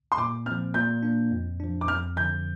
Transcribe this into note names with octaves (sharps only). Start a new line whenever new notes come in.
C6
A#2 D6
F3 C4 F6
A#2 G6
A#3 D4
F2
F3 D4
D6
F2 F6
D3 F3 G6